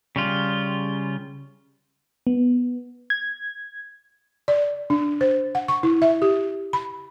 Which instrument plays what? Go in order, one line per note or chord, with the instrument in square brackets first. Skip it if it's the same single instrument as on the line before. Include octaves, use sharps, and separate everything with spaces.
[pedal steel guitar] C#3 G3 F4
[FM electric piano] B3
G#6
[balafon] D5
D4
C5
F#5
C#6
E4
E5
G4
B5